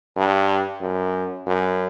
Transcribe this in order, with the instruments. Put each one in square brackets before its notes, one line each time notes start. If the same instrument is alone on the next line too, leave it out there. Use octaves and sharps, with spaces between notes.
[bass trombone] G2
F#2
F#2